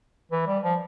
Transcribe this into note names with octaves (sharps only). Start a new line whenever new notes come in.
E3
G3
F3